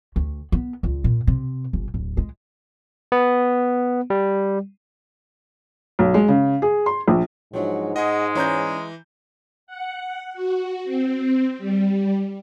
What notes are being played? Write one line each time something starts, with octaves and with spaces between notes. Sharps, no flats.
D2
B3
C#2
A#2
C3
G1
D1
G#3
B3
G3
B1
G#3
C#3
G#4
C6
A#1
G#2 F3 F#3 D4
G#3 G#4 D#5 F#5
E3 C#4 D#4 D5 A#5 G6
F#5
F#4
C4
G3